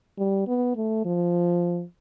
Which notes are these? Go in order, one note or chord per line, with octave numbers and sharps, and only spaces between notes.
G3
B3
A3
F3